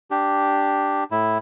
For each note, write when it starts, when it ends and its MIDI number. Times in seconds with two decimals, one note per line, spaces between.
0.11 1.04 62
0.11 1.04 67
1.11 1.38 45
1.11 1.38 64